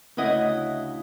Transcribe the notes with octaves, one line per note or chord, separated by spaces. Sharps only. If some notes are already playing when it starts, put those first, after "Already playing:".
D2 C#3 E4 D#5 F#5